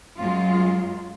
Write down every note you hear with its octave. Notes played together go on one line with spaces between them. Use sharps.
F#2 F#3 G#3 F4